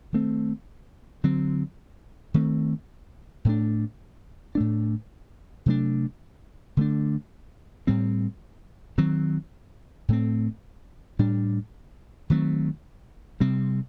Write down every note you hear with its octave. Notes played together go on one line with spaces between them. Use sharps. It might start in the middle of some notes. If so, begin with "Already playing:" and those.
D#3 A3 C4
D3 F#3 C4
D#3 A3 C4
A2 A3 D4
A2 A3 D4
C3 F#3 A3 D4
D3 A3 D4
A2 G3 C4
D#3 F#3 C4
A2 A3 C4
A2 G3 D4
D#3 F#3 A3 C4
C3 G3 C4